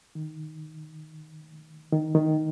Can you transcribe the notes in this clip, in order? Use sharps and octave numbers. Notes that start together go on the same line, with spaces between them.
D#3
D#3
D#3